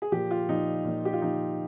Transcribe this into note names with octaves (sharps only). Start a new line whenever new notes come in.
G#4
A#2 F3 G4
F4
A#2 F3 D#4
A#2 F3
G4
F4
A#2 F3 D#4